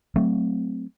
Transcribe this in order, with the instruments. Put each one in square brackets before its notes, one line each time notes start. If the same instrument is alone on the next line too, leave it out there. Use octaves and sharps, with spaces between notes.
[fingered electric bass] F#3 A3 C4